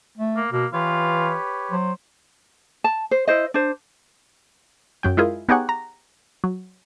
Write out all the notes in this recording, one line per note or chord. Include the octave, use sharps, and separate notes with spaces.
A3
A#3
B2 A#3
E3 F4 G4 B4 C#5
F#3 C5
A5
C5
E4 C5 D#5
D4 C5
F#2 F#3 G5
G#3 E4 F4 G#4 A#4
B3 D#4 G4 G#4 C#5 F#5
A#5
F#3